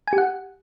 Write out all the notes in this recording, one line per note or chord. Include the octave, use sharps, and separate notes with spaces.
G#5
G4
F#5